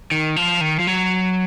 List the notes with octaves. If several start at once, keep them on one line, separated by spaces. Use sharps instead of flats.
D#3
F3
D#3
F3
F#3